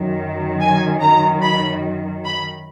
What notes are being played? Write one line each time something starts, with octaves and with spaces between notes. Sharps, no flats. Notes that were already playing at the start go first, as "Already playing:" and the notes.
Already playing: F#2 D#3
G#5
A#5
B5
B5